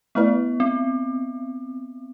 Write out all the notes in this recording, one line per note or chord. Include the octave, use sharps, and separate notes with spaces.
A3 B3 E4 B4 D5
C4